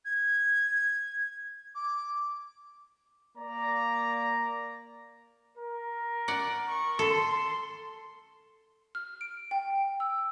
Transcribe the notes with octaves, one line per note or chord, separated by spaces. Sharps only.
G#6
D6
A#3 D5 A#5
A#4
D5 F#5
C#6
A4 C6
F6
D7
G5
E6